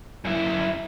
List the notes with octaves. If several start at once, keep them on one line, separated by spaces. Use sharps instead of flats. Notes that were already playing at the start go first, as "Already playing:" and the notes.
F#2 E4